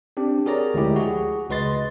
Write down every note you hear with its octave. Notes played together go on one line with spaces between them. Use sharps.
C4 D4 G4
F#4 G#4 A#4 C#5 D5 A#5
D2 F3 G#3 E4 G4
F#4 G#4
C#2 F#4 B4 D#5 C6 A6